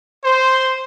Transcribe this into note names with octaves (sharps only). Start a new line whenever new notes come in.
C5